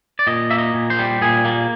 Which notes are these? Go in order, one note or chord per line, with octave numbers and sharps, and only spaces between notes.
D5
A#2 D#5
A#3 E5
D#5
A#2
C5
G3
A#2 G#4
A#3